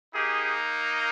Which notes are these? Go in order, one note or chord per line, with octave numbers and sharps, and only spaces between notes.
A#3 D#4 G4 G#4